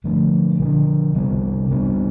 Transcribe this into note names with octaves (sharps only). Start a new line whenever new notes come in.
D3 F3 A3 D4
D3 F3 A3 D4
C3 G3 B3 D4
C3 G3 B3 D4